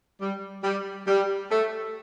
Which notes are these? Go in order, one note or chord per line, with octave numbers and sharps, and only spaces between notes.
G3
G3
G3
A3